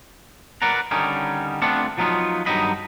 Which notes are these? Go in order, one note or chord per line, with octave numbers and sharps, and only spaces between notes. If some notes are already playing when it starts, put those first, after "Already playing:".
A#4 B4 D5 F#5 A#5
D3 D#3 G3 C#4 D#4
A3 B3 C4 D4 F4 F#5
F3 F#3 B3 D#4 F4
G2 D#3 F#3 D#4 D#5 B5